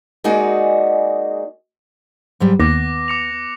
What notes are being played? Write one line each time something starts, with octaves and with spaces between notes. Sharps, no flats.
G#3 A#3 D#4 F#4 G#4 D5
G#2 F#3 G3
D#2 B3 D6 F#6 A#6
D6 C#7 F7